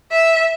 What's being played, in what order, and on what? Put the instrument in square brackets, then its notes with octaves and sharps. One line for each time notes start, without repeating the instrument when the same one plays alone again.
[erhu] E5